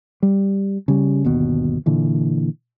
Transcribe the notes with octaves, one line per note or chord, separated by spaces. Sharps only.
G3
C#3 G3
G1 D#2 B2
A#2 D3 E3